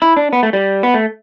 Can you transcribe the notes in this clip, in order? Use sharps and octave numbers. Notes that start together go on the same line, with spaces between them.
E4
D4
B3
A3
G3
B3
A3